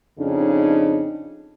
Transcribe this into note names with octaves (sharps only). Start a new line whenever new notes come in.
F2 C#3 D4 D#4